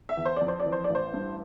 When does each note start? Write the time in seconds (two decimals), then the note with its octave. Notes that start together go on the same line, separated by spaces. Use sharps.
0.09 E5
0.17 E2
0.25 C5
0.36 F2 D5
0.48 C5
0.60 D5
0.66 E3
0.72 C5
0.84 D5
0.89 A1
0.95 C5
1.13 G2